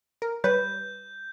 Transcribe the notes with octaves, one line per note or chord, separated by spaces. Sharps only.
A#4
G3 B4 C#5 G6